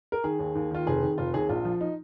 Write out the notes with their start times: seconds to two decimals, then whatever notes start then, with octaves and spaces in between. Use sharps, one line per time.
0.12 A#4
0.24 D#3 G#4
0.39 D#2
0.55 D#2
0.71 D#3 F4
0.87 F1 G#4
1.02 D#3
1.18 F1 F4
1.34 D#2 G#4
1.49 A#1 F4
1.65 F3
1.81 D#4